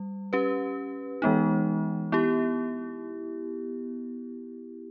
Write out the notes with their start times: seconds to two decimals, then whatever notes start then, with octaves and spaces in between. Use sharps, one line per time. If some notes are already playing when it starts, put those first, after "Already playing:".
Already playing: G3
0.33 C#4 G4 B4
1.22 E3 G#3 B3 D#4
2.12 B3 E4 G4